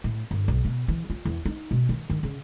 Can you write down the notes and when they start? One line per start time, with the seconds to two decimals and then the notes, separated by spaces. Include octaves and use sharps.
0.04 A2
0.31 G1
0.48 B1
0.65 B2
0.88 E3
1.10 F4
1.25 E2
1.46 D#4
1.71 B2
1.89 D#3
2.10 D#3
2.23 C#3